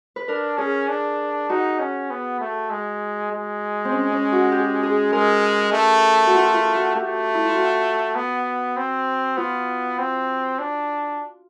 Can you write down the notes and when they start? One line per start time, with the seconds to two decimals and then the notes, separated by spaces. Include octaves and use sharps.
0.16 B4
0.28 D4 A#4
0.58 C#4 G#4
0.88 D4
1.49 D#4 F#4
1.79 C#4
2.10 B3
2.41 A3
2.70 G#3
3.31 G#3
3.85 C4
3.92 C#4
4.12 C#4
4.32 F#4
4.52 G4
4.83 G#4
5.13 G#3 A#4
5.73 A3
6.27 F#4
6.35 F4
6.54 F4
6.75 F#4
6.95 A3 G4
7.34 E4
7.45 F4
7.55 F#4
8.15 B3
8.77 C4
9.37 B3 F4
9.99 C4
10.59 D4